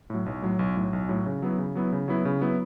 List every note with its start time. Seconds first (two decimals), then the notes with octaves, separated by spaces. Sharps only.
0.10 A2 F#3
0.26 B1
0.42 A2 F#3
0.59 B1
0.76 A2 F#3
0.93 B1
1.09 A2 F#3
1.26 C#3
1.42 F#3 B3 E4
1.58 C#3
1.75 F#3 B3 E4
1.93 C#3
2.08 F#3 B3 E4
2.25 C#3
2.41 F#3 B3 E4